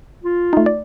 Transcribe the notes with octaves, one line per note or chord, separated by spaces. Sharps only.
F4
A3 D#4
D5